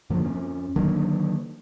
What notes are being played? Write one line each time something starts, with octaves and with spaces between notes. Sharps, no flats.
F#2 D3 F3 A#3
F2 C#4
D3 D#3 F#3 A#3